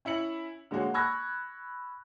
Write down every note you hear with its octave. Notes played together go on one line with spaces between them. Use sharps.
C#4 E4 E5 C#7 F#7
D3 G#3 A#3 F#4 C#5
B5 C#6 E6 F#6 G#6 A#6